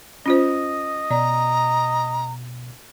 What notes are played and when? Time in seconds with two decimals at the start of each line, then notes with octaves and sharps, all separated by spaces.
0.26 C#4 F4 C5 D#5
1.11 B2 D5 A#5